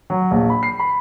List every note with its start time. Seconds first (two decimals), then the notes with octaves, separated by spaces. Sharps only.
0.10 F#3
0.31 A#1
0.50 B5
0.63 C7
0.79 B5